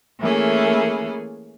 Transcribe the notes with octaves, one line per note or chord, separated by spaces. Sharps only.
E3 A3 A#3 C#4 G#4